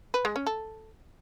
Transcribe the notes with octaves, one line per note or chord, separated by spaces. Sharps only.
B4
G#3
C#4
A4